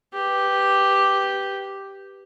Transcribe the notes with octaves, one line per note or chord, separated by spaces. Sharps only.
G4 B4